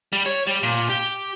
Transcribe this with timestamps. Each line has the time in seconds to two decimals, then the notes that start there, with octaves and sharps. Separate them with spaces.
0.13 G3
0.26 C#5
0.47 G3
0.63 A#2
0.89 G4